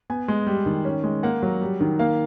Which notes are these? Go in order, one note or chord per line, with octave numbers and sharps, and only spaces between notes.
B3 G#5
G#3
G3
D#3
C#4
G#3
A#3 F#5
F#3
G3
D#3
A#3 F5